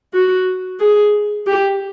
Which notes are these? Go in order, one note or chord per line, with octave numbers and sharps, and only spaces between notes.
F#4
G#4
G4